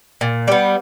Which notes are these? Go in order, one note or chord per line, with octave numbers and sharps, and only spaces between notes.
A#2
G3 B3